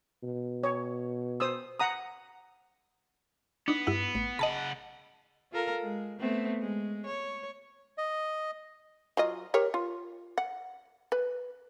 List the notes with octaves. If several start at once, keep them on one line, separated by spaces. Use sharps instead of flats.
B2
C#5
C5 D#6 E6
F#5 A#5 D#6
B3 D4 D#4
G2 E4 F#5
A1
C#3 D#5 F#5 A5 B5
F4 A4 A#4
G#3
A3 B3 C4
G#3
C#5
D#5
F#3 F4 D#5
G4 A#4 C#5
F4
F#5
B4